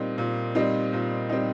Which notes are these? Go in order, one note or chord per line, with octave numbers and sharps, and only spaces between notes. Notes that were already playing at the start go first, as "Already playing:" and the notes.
Already playing: A#2 G3 C4 D#4
A#2
G3 C4 D#4
A#2
G3 C4 D#4